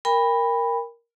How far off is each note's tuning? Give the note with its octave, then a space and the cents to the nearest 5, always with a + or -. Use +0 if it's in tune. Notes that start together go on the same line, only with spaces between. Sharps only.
A#4 +0 G5 +40 B5 +0